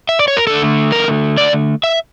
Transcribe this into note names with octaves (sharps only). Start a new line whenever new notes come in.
E5
D5
C#5
A#4
D3 A3 A4
A#4
D5
E5